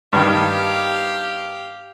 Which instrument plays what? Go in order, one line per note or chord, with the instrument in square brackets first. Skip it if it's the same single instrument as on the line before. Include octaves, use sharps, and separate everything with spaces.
[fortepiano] G2 D#3 [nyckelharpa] G4 F5